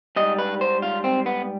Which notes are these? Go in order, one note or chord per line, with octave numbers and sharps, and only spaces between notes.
G#2 G3 D#5
B4
C5
F4
C4
B3